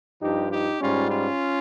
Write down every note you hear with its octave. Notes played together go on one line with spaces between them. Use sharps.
G2 F3 D#4 G4
D#4 G4
G#2 G3 C#4 F4
C#4 F4